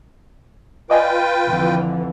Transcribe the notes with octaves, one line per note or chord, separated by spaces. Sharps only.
F4 B4 D5 D#5 G5 G#5
F2 D3 E3